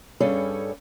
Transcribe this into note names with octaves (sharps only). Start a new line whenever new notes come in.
G2 G3 C#4 G#4 A4 C#5